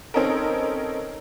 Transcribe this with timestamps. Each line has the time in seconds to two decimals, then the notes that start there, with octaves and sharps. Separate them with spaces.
0.14 C4 C#4 D#4 A4 A#4